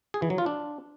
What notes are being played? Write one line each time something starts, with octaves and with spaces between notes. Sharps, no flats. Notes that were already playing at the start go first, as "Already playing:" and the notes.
G#4
E3
F#3
F4
D4